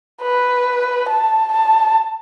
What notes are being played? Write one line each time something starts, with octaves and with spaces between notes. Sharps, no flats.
B4
A5
A5